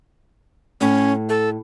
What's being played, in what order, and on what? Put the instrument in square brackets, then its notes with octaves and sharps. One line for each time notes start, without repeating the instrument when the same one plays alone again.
[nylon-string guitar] A2 [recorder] C#4
[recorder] A4